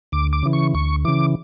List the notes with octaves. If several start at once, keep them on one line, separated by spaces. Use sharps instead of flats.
D2 D6
D6
C#3 E3
C#6
D2 C#6
C#3 E3 D6